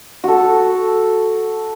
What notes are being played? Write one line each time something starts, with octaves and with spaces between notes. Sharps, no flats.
F#4 A4